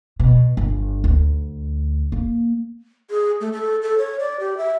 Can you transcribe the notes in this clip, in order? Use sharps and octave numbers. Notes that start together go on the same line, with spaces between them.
B2
G1
D2
A#3
G#4
A3
A4
A4
C#5
D5
G4
E5